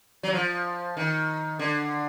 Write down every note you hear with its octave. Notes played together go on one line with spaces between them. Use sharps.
F#3
F3
D#3
D3